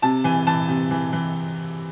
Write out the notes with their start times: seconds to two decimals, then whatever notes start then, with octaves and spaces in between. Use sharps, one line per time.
0.02 C3 A5
0.24 E3 G#5
0.47 E3 A5
0.68 C3
0.91 E3
1.13 E3